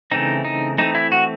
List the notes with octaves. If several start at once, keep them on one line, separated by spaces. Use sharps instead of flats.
C#3 E3 A3 C4 D#4
D#4
E3 A3 C4 D#4
E4
F#4